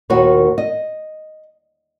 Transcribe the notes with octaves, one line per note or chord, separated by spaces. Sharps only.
D#2 A#2 D#3 F#4 B4 C#5
D#5